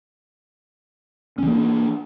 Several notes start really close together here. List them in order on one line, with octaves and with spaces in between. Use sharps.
C#4 E3 A#3 D4